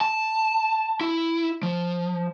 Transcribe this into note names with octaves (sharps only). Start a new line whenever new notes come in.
A5
E4
F3